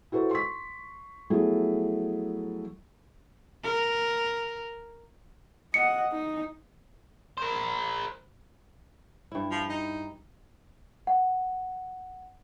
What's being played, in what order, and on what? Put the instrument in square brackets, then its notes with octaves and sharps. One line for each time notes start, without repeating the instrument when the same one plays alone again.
[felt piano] E4 F#4 A4 B4 C5
C6 C#6 B6
F3 F#3 A3 B3 E4 G#4
[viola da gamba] A#4
[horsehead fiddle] D#5 F#5 [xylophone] C#7
[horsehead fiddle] D#4
[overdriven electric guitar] A#4 C5
[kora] G2 E4
[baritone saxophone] F3
D#4
[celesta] F#5